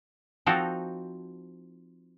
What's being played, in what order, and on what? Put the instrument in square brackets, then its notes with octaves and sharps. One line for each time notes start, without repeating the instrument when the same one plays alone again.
[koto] F3 C4 D#4 F#4 A4 A#4